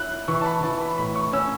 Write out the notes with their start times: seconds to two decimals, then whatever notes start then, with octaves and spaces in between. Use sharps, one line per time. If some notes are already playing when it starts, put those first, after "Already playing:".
Already playing: E4 F#6
0.28 E3 C#6
0.41 A5
0.45 B5
0.63 E3 A5
0.81 B5
0.98 A2 B5
1.16 C#6
1.33 C#4 E6